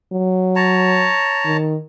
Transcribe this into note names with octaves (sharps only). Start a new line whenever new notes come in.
F#3
C#5 A5 A#5
D#3